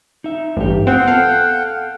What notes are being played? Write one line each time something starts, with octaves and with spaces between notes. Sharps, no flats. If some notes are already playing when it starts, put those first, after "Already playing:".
D#4 E5
A1 G2 G4
B3 C4 F4 F#5 G5
A4 F5